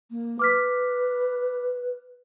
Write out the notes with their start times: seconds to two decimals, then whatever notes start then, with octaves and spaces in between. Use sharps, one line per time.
0.11 A#3
0.39 B4 D6 F6 B6